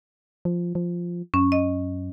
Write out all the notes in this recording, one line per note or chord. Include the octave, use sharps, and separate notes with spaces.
F3
F3
F#2 C#4
D#5